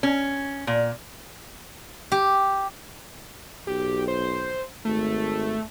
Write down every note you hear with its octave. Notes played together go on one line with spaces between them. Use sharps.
C#4
A#2
G4
B1 G4
C5
G#1 A3